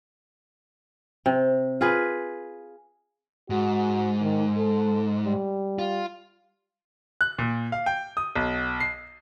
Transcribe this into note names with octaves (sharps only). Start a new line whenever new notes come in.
C3
F4 G#4 B4
G#2 F#4
D#3
A4
G3
F4
F#6
A#2
F5
G5
D#6
B1
C7